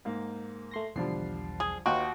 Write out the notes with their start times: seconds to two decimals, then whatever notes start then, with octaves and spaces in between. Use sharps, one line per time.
0.05 G#2 A#3
0.71 A3 C6 A#6
0.96 B1 E2 D3 F3 G3 C7
1.60 G#4
1.86 D#2 D#4 F4 F#4 B4 G5 D7